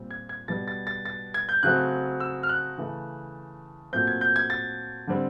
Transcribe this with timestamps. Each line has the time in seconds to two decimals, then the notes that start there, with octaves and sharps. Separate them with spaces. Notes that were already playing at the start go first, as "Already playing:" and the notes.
Already playing: A#2 G3 C4
0.11 G#6
0.29 G#6
0.48 B2 G3 B3 A6
0.68 A6
0.87 A6
1.05 A6
1.34 G#6
1.49 G6
1.63 C#3 F#3 A3 C4 F#6
2.20 E6
2.43 F6
2.49 F#6
2.78 C#3 E3 A3
3.93 A#2 F#3 A3 C4 G6
4.07 G#6
4.21 G6
4.36 G#6
4.50 A6
5.07 D3 G3 C4